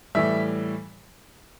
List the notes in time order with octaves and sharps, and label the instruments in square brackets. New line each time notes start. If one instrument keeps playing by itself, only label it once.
[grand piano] A2 E3 G3 E5